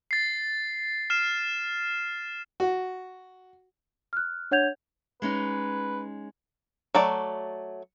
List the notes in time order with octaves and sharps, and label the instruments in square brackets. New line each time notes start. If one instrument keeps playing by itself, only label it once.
[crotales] A6 C7
F6 C7 E7
[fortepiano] F#4
[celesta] F6 F#6
D4 C#5 F#5 G6 G#6 F7
[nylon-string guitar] G#3 C#4 D#4 [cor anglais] B4
[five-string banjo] F#3 A3 D5